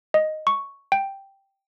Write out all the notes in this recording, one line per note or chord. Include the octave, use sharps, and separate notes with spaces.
D#5
C#6
G5